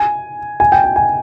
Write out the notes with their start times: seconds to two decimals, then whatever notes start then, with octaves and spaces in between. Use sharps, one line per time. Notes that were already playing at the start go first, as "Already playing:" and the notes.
Already playing: G#5
0.60 G#5
0.72 G5
0.84 G#5
0.96 G#5